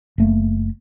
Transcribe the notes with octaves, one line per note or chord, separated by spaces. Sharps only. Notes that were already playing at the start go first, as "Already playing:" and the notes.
F#1 A3 A#3